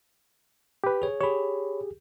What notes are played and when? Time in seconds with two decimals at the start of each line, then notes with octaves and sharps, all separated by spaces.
0.84 G4 B4
1.02 G#4 C#5
1.21 G4 G#4 C#5 B5